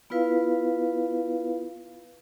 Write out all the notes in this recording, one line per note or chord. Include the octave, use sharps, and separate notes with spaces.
B3 E4 F4 B4 F5